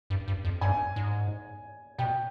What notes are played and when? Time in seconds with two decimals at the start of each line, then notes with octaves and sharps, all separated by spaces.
0.10 G2
0.28 G2
0.45 F2
0.61 G2 G#5
0.96 G#2
1.98 B2 G5